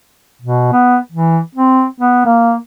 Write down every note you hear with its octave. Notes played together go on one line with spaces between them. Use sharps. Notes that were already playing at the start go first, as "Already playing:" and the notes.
B2
B3
E3
C4
B3
A#3